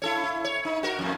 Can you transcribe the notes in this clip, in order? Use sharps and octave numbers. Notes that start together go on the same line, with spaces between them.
E4 A4 C#5
E4
C#5
D#4
F#4 A#4
F2 A2